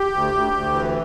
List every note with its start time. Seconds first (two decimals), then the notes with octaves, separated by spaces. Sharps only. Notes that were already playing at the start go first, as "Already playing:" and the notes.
Already playing: G4
0.14 D2
0.33 D2
0.53 D2
0.73 E3